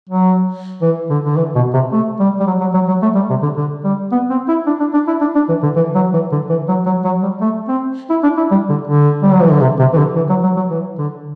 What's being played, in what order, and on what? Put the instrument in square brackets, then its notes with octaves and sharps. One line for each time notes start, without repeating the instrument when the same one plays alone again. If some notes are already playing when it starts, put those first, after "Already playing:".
[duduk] F#3
E3
D3
D3
E3
B2
C3
A3
G3
G3
F#3
F#3
F#3
F#3
A3
G3
C3
D3
D3
G3
B3
C4
E4
D4
D4
D4
E4
D4
D4
E3
D3
E3
F#3
E3
D3
E3
F#3
F#3
F#3
G3
A3
C4
E4
D4
E4
G3
D3
D3
G3
F#3
E3
D3
C3
C3
E3
D3
E3
F#3
F#3
F#3
E3
D3